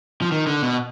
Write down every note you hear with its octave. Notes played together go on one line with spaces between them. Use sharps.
F3
D#3
D3
B2